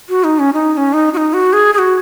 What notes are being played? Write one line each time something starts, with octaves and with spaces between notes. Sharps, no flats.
F#4
D#4
C#4
D#4
D#4
C#4
D#4
F#4
D#4
F#4
G#4
G#4
F#4